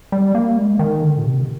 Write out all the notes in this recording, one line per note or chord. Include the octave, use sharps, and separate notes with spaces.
G3
A#3
G#3
D#3
D3
A#2
C3